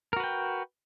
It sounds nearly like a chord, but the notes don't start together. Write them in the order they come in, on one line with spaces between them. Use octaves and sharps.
A#4 F#4 B4 G5